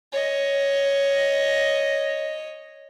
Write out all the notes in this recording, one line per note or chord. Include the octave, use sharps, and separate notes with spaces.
C#5 D#5